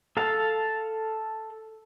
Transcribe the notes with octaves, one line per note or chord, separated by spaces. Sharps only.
A4 F5 A5